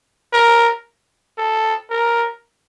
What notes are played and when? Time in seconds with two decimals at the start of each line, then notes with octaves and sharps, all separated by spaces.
0.33 A#4
1.38 A4
1.90 A#4